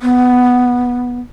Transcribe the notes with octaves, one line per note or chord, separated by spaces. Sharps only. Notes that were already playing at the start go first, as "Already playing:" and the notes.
B3